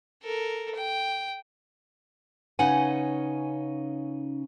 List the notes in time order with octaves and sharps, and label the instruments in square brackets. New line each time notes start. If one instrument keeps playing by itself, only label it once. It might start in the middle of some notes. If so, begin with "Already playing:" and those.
[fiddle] A4 A#4
G5
[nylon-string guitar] C#3 C#4 D#4 B4 F#5 G#5